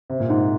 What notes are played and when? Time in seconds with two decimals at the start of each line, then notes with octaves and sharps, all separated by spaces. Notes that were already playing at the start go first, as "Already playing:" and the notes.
0.10 C3
0.20 A#2
0.29 G#2